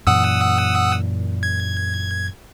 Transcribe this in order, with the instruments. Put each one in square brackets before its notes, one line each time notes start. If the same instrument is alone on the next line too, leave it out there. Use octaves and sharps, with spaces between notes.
[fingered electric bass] F#2 A#2 E3 [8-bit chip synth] F#5 D#6 E6
[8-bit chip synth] G#6